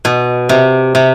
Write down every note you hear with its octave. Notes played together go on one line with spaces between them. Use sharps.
B2
C3
C3